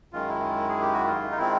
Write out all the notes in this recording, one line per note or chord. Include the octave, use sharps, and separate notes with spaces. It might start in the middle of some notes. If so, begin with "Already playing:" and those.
F#2 D#3 G#3 F4
E4
G#4
G4
F#4
F4
D#4
D#3 G#3 C4 E4